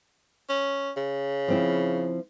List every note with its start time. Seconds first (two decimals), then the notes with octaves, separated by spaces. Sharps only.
0.49 C#4
0.97 C#3
1.48 F3 C4 E4